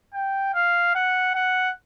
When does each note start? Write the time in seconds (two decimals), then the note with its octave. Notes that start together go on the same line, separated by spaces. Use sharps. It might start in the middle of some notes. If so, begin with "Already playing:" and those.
0.14 G5
0.54 F5
0.95 F#5
1.35 F#5